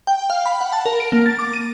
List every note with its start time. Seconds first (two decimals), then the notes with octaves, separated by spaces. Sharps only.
0.07 G5
0.30 F5
0.46 B5
0.61 F#5
0.73 A5
0.86 A#4
1.00 D7
1.12 A#3
1.26 A6
1.39 D6
1.53 D#7